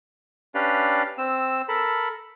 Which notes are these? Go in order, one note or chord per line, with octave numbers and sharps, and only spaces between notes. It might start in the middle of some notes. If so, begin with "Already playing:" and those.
C#4 D4 G4 B4 D5 F5
C4 E6
A4 A#4 B5